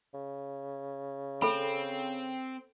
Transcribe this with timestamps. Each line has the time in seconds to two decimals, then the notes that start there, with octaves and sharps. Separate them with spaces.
0.14 C#3
1.42 C4 A4 B5